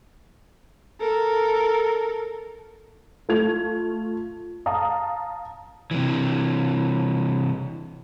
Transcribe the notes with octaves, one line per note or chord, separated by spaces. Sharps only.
A4 A#4
A3 F4 G#6 F7
F5 A5 A#5 D#6
C3 E3